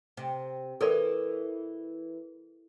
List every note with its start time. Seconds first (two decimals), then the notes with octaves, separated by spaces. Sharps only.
0.17 C3
0.81 E3 A4 A#4 D5